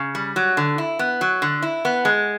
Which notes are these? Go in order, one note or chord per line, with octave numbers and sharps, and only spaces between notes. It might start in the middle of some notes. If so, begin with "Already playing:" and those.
Already playing: C#3
G3
F#3
D3
E4
B3
F#3
D3
E4
B3
G#3